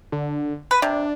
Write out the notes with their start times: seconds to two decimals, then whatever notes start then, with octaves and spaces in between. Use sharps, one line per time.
0.12 D3
0.71 B4 B6
0.82 C3 D4